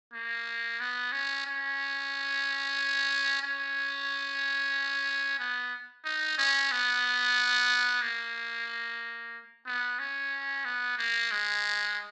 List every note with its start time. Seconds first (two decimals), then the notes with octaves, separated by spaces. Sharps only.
0.14 A#3
0.80 B3
1.12 C#4
1.46 C#4
3.42 C#4
5.39 B3
6.05 D#4
6.38 C#4
6.71 B3
8.02 A#3
9.67 B3
9.99 C#4
10.65 B3
10.98 A#3
11.31 G#3